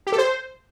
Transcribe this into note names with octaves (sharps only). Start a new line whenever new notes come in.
G4
A4
C5